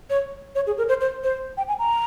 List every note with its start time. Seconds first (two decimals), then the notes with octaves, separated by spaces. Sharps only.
0.10 C#5
0.55 C#5
0.67 G#4
0.78 A#4
0.89 C5
1.01 C5
1.23 C5
1.57 G5
1.68 G#5
1.79 A#5